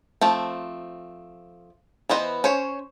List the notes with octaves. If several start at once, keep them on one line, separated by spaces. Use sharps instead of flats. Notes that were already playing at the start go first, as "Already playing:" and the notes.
F3 A3 C4
E3 B3 C5 D#5
C#4 C5 C#5